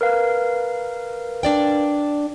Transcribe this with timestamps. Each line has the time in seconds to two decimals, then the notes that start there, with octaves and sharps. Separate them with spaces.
0.01 A#4 B4 F5
1.43 D4 D5 G5